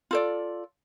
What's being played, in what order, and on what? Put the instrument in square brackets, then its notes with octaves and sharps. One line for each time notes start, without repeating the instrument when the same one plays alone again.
[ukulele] F4 A4 D5